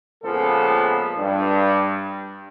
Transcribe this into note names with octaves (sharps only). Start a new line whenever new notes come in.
A#2 C#3 F3 G#3 B3 A4
G2